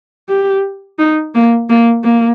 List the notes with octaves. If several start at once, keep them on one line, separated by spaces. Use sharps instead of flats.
G4
D#4
A#3
A#3
A#3